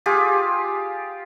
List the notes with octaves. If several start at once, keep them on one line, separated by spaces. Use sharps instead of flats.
F4 G4 G#4